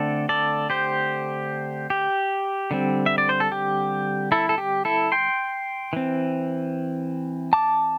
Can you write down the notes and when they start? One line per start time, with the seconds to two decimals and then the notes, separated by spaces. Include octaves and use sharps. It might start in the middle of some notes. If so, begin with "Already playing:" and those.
Already playing: D3 A3 C4 A4 D5
0.29 A4 D5
0.70 G4 C5
1.90 G4
2.71 D3 G3 C4
3.06 E5
3.18 D5
3.29 C5
3.40 A4
3.52 G4
4.32 E4 A4
4.49 A4
4.58 G4
4.85 E4 A4
5.12 G5 C6
5.93 E3 C4
7.53 A5 D6